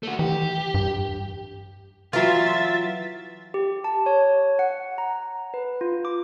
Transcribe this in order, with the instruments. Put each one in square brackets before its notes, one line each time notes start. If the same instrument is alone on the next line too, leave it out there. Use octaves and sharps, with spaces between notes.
[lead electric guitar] A3 F#4
[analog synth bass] E3 [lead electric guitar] G4
[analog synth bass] G2
[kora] E3 F#3 [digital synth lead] F4 [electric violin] E5 A6
[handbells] G4
A5
C#5
F#5
A#5
B4
F4
D6